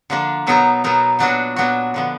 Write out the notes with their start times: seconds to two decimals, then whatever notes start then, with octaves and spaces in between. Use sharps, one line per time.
0.10 D3 F3 A#3 D4
0.47 B2 F#3 B3 D#4 A#4
0.84 B2 F#3 B3 D#4 A#4
1.19 A#2 F#3 B3 D4 F#4
1.56 A#2 F#3 B3 D4 F#4
1.94 D3 F3 B3